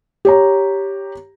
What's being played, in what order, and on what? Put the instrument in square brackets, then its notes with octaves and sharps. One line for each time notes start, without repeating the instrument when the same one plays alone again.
[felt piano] G4 C#5 A#5